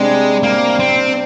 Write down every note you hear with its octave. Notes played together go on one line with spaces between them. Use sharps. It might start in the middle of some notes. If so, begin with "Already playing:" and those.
Already playing: C3 G3 G#3 D4
A#3
C4